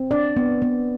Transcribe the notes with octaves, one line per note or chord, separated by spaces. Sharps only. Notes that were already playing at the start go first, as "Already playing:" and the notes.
Already playing: C4
D4 D5
B3
B3